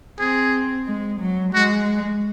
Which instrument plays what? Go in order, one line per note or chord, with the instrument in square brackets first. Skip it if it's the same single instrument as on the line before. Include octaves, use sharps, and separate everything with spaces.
[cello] C4 [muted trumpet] G#4
[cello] G#3
F#3
[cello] G#3 [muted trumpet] F#4